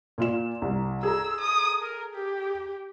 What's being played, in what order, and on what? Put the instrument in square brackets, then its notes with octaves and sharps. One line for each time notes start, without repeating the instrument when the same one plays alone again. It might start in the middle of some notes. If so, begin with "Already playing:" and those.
[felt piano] A#2 F4 E7
C2
[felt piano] G#4 A4 A#5 [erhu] E6
[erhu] D#6
A#4
G4